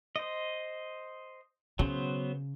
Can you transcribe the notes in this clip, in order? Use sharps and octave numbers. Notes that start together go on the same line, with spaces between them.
C5 D#5
C#3 F#3 B3 C5